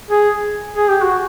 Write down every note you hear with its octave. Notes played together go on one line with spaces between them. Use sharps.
G#4
G#4
G4
F#4